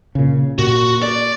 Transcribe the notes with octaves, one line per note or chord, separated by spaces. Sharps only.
A#2 C#3
A#2 F#4
D5